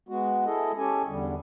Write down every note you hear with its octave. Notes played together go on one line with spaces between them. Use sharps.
G#3 B3 F#4
E4 G#4 A4 D#5
C#4 G4 A4 G#5
E2 D3 G3